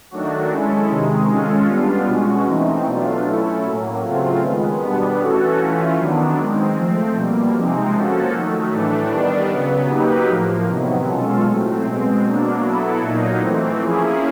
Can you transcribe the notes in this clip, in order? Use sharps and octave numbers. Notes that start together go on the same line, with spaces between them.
D#3 F#3 A3 D4 F#4
G#3 C#4 E4 A4
C3 D#3 G#3
G#3 C#4 F4 A4
G3 B3 D4 F4
B2 G#3 C#4 F#4
E3 A3 C4 D#4
B2 F#3 A3 D4 F4
A3 C#4 E4 A4
A2 F#3 A#3
C#3 F#3 A3 C4 F4
D#3 G#3 B3
B2 G3 B3 D4
E3 A3 C#4 F#4 A4
E3 A3 C#4 F4
D#3 F#3 B3 D4
D#3 G#3 C4
F3 A3 C4
B2 G3 A#3
C3 F3 G#3 C4 D#4
F3 A#3 C#4 F#4 A4
D#3 F#3 A3
A2 E3 A3 D4
D#3 G3 B3 D4
C#3 F#3 B3
F#3 A#3 D#4 G4 B4
A2 F3 A#3
C3 D#3 F#3 B3
B2 G#3 C#4 F4 A4
A2 F#3 A3 C4
B2 G#3 C4
B2 F#3 A#3 D4
F#3 B3 E4 A4
A#2 F#3 A#3 D#4
E3 A3 C4
F3 A#3 C#4 E4 G#4